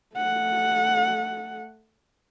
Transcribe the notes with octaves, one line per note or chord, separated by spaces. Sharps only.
A3 F#5